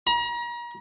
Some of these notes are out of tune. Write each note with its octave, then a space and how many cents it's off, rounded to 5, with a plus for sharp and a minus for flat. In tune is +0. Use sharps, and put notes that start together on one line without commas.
A#5 +35